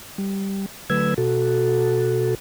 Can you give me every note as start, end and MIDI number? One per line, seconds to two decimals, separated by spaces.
0.18 0.66 55
0.90 1.14 50
0.90 1.14 54
0.90 1.14 57
0.90 1.14 71
0.90 1.14 88
0.90 1.14 92
1.18 2.35 47
1.18 2.35 66
1.18 2.35 69